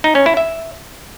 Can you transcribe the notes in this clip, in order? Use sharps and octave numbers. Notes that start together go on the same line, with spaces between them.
D#4
C#4
E4
E5